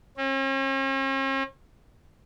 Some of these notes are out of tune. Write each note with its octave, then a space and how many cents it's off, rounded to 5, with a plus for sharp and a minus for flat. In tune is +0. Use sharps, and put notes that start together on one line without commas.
C#4 -45